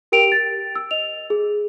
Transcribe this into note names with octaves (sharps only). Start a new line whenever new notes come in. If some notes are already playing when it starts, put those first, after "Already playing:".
G4 A#4 G5 D7 F7
A6
E6
D#5 F7
G#4